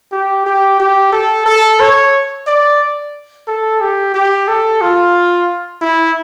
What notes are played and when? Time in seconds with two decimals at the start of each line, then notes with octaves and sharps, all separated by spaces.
0.12 G4
0.46 G4
0.80 G4
1.12 A4
1.46 A4
1.81 C#5
2.47 D5
3.48 A4
3.81 G4
4.14 G4
4.48 A4
4.81 F4
5.81 E4